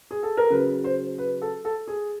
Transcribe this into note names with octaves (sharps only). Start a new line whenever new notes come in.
G#4
A4
A#4
C#3 F#3 B4
C5
B4
A4
A4
G#4